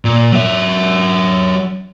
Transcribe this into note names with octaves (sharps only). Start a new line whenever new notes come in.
A#2
F#3 E5